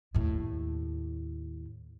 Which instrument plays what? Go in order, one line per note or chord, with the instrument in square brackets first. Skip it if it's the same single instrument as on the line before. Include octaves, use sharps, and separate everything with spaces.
[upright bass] D#2 A2